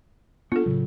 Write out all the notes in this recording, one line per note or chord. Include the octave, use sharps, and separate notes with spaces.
B3 D4 F4 A4
A2 C#3 F#3